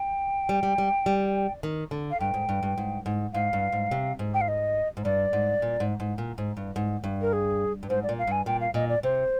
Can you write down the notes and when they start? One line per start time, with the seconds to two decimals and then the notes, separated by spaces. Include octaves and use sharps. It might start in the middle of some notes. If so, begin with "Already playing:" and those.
Already playing: G5
0.49 G3
0.63 G3
0.78 G3
1.06 G3
1.63 D#3
1.91 D3
2.11 F5
2.20 G2 G5
2.34 G#2
2.49 G2
2.63 G2
2.78 G#2
3.06 G#2
3.33 G#2 F5
3.53 G2
3.72 G#2
3.91 C3
4.19 G#2
4.34 G5
4.41 F5
4.48 D#5
4.97 G#2
5.04 G2 D5
5.33 G#2
5.62 A#2
5.80 G#2
6.00 G#2
6.18 A#2
6.38 G#2
6.57 G2
6.76 G#2
7.04 G2
7.21 A#4
7.33 G#4
7.83 G2
7.89 G#2 C5
8.03 D5
8.09 A#2
8.18 F5
8.27 G2 G#5
8.46 A#2 G5
8.61 F5
8.74 A#2 D#5
8.89 D5
9.03 C3 C5